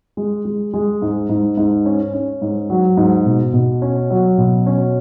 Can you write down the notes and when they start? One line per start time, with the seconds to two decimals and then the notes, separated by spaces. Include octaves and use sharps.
0.17 G#3
0.45 G#3
0.73 G#3
1.02 G#2
1.29 G#2
1.57 G#2
1.86 C#4
2.14 C#4
2.42 G#2
2.70 F#3
2.97 G#2
3.26 B2
3.53 B2
3.82 C#4
4.10 F#3
4.38 B2
4.66 C#4